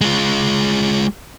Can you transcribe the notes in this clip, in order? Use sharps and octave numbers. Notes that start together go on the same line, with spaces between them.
G#3 F4